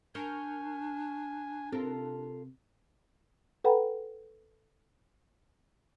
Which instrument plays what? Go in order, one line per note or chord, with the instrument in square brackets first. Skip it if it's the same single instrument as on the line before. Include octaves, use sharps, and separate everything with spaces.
[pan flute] D4 [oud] A#4 [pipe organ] G#5 [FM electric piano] C#6 F6 G6
[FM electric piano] C3 [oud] F4 A4 A#4
[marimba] A4 B4 F#5 G5 A#5 B5